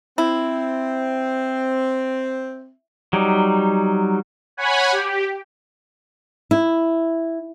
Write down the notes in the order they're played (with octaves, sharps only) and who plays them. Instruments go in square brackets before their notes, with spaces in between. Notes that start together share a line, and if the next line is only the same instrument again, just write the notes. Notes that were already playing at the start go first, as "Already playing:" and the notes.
[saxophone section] C4 [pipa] E4
[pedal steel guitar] F#3 G3 D#4
[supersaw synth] C#5 F#5 G#5 B5
G4
[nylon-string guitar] E4